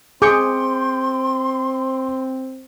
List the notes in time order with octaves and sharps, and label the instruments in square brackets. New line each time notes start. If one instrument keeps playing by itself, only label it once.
[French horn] C4 [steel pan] G#4 [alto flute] C6 [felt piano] D6 G6 C#7